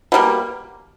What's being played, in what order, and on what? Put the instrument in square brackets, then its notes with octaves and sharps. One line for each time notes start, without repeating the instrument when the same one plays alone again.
[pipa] B2 G3 A#3